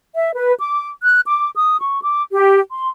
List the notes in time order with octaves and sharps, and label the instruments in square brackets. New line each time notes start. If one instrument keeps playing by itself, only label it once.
[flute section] E5
B4
D6
F#6
D6
D#6
C#6
D6
G4
C6